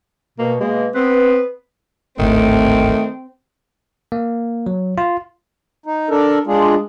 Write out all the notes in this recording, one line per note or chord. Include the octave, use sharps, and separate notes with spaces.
B2 A#3
B2 G#3 A#3
B3 C4 B4
D1 G#1 A2 D#3 A3 C4
A#3
F#3
F4
D#4
D4 A4 A#4
G#3 D4 F4 G#4